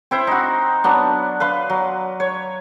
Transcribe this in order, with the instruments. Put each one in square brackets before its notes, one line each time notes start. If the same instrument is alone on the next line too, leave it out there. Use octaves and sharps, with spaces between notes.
[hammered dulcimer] C4 E4 C5
D#4 F#4
F#3 B3 D4
B4 F5 C6
F#3
C#5